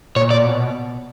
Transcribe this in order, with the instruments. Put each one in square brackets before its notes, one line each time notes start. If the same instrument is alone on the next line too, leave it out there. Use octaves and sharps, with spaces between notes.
[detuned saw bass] A#2 [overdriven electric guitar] C#5
[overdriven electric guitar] D5
[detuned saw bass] B2